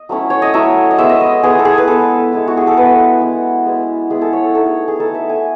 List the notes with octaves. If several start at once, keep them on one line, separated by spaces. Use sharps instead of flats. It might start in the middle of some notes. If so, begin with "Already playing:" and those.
Already playing: D#5
F#3 A3 C#4 E4
C#5
D#5
F#3 A3 C#4 E4 E5
D#5
G#3 B3 E4 E5
D#5
D#5
G#3 B3 E4 G#4
A4
G#4
B4
G#3 B3 E4 A4
G#3 B3 E4
F#4
G#4
A4
G#3 B3 E4 B4
G#3 B3 E4
G#3 B3 E4
G#3 B3 E4 G#4
A4
C#5
A4
A3 D#4 A4
G#4
G#4
A3 D#4 A4
E5
G#5